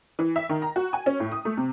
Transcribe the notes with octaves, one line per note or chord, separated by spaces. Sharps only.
E3
E5
D#3
A#5
F#4
G#5
C#4
A2
D#6
A3
C3